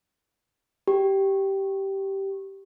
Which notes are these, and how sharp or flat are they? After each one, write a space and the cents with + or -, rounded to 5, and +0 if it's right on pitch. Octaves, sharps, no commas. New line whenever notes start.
G4 -10